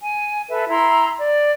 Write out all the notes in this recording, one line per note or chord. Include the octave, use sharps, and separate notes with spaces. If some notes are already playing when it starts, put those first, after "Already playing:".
G#5
A4 B4 E5
E4 A#5 C6 E6
D5